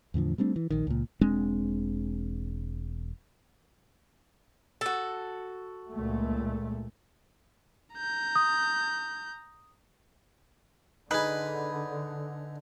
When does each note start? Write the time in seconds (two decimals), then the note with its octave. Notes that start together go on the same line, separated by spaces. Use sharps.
0.14 E2 A2 D3 F3
0.38 G3 A3 C4 D4
0.56 E3
0.70 A#1 D#3
0.87 C#2 A#2
1.21 E1 G#3 C4 D4
4.81 F#4 A4
5.91 C#2 A#2 A3
7.95 A#5 G6
8.36 D#6
11.11 D3 D#4 G#4 B4